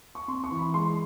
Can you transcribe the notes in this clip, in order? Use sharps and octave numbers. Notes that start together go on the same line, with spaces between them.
C#6
C4 C6
C#6
E3
B5
G#3 C6